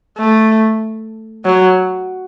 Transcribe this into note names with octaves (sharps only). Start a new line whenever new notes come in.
A3
F#3